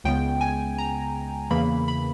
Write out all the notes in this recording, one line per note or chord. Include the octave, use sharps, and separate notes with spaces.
C#2 C#3 G#3 B3 G5
G#5
A#5
E2 C#3 E3 A#3 B5
B5